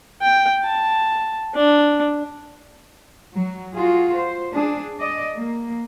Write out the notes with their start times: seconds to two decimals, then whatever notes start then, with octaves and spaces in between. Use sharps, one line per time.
0.22 G5
0.65 A5
1.55 D4
3.34 F#3
3.75 F4 F#4 G#4
4.13 C5
4.52 D4 G#4
4.97 D5 D#5
5.37 A#3